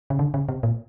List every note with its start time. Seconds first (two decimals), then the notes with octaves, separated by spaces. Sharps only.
0.10 C#3
0.19 D3
0.34 C#3
0.49 C3
0.63 A#2